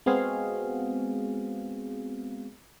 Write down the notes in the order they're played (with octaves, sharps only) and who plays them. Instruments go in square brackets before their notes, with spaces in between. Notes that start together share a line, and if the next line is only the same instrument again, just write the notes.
[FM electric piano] G#3 B3 C4 F#4 G#4 F5